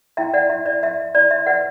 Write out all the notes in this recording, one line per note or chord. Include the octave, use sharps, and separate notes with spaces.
E4 E5 G5
D5 F#5
E4 E5
D5
B4 E5
E4 D5
E5
B4 D5 F#5